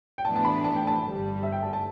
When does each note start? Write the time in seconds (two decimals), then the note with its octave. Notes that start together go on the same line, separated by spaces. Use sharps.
0.18 G5
0.25 A2 E3 B3 D4 A5
0.36 A5
0.45 B5
0.64 A5
0.76 G5
0.87 A5
1.03 G1 G2 G3
1.43 E5
1.52 G5
1.62 A5
1.73 A5